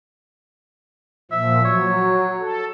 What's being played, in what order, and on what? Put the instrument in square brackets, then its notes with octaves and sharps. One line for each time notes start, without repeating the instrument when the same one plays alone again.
[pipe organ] A#2 F3 [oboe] E5
[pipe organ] F#3 [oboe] C#5
[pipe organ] A4